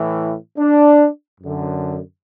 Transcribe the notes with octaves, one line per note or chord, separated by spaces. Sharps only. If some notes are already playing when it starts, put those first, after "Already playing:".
Already playing: A2 E3
D4
F#2 D3